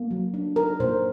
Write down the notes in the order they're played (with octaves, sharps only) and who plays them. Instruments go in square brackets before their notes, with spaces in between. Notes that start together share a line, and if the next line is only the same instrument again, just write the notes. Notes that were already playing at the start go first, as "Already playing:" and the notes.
Already playing: [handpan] A#3
F#3
D4
D#4 A#4
A#2 C5